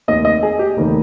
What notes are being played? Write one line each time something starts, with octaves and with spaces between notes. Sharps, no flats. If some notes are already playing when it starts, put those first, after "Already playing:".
F1 D#2 D#3 D#5
D#5
G#4
G4
F1 D#2 D#3